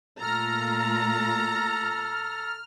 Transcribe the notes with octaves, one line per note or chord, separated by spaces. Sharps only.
A#2 A3 F4 A4 A#5 F6